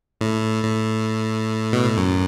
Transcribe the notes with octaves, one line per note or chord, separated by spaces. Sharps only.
A2
A2
B2
A2
F#2